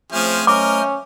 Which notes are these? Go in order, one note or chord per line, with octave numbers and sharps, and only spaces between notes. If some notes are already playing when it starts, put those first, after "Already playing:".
F3 A3 C4 C#4 G#4 C5 F6
C#4 A#4 D#5 D6